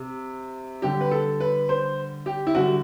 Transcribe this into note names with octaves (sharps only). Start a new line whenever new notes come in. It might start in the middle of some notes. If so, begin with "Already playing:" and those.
Already playing: C3
D3 G3 G4
B4
A4
B4
C5
G4
E4
D3 G3 F#4